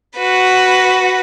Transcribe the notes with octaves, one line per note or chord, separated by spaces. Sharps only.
F#4 B4